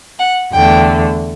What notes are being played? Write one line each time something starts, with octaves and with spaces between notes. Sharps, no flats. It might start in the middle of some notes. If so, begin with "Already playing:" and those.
F#5
E2 D3 A3 G5